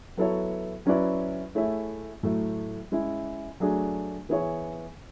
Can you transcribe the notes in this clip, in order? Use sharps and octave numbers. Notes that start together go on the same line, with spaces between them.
F#3 B3 E4 A4 C#5
F#3 C#4 E4 B4 D5
A3 E4 G#4 C#5 E5
A2 F#3 A3
G#3 C#4 E4
F#3 A3 D4 G#4
E3 B3 E4 G#4 C#5